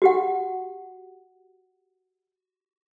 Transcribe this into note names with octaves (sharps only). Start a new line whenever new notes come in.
F#4 G4 F#5